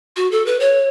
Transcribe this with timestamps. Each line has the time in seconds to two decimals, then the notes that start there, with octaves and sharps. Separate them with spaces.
0.16 F#4
0.31 A4
0.46 B4
0.60 C#5